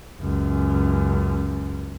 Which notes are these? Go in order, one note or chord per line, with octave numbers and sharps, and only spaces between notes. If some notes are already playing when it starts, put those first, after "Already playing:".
C#2 F#2